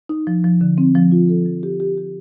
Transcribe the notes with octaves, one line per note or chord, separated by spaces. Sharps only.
D#4
F3
F3
D3
C4
F3
F4
A4
F3
G4
G4
G4